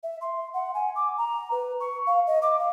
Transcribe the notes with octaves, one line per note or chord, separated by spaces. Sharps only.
E5
C6
F#5
G#5
D6
A#5
B4
C#6
F5
D#5
D6
F5